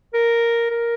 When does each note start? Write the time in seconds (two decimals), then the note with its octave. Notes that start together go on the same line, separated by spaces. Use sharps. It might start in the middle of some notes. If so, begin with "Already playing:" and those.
0.14 A#4
0.70 A#4